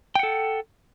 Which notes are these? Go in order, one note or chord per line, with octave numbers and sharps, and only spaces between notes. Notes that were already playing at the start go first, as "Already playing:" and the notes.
A4 F#5 G5